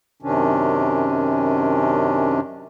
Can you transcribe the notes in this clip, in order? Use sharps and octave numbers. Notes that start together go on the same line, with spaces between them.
F#2 C3 D#3 C#4 D4